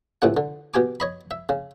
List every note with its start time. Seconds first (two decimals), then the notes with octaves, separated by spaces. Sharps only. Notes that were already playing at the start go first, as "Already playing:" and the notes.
0.22 C#2 A2 C3 F#5
0.37 D3
0.74 B2 G4 G#5 D6
1.00 C#5 D#5 B5
1.31 E5
1.49 C#3